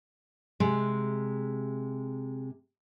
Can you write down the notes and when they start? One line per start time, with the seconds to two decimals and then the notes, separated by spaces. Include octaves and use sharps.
0.60 C3 G#3